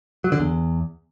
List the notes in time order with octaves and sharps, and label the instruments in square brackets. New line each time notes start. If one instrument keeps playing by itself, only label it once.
[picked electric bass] F#3
D3
E2